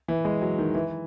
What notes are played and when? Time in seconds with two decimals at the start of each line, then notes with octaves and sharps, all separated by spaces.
0.08 E3
0.25 G#3
0.42 F#3
0.59 D#3
0.75 E3